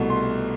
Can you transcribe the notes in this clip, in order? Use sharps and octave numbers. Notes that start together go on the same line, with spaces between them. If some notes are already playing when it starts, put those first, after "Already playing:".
Already playing: C2 B2 A3
C6